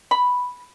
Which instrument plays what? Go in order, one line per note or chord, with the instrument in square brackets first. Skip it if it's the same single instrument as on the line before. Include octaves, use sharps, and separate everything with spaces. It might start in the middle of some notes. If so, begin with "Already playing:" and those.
[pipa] B5